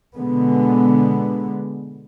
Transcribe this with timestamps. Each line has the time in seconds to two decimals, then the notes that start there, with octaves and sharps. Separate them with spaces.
0.15 B2 D3 G#3 B3